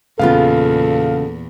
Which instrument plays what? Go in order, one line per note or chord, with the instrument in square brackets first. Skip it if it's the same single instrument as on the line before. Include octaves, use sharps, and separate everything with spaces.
[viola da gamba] E2 A#2 [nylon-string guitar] C#3 B3 F4 [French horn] A4 [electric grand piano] F5